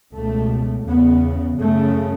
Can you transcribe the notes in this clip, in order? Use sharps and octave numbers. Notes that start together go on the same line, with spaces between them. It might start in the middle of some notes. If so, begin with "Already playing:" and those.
C#2 B2 A3
E2 C#3 B3
F#2 C#3 A3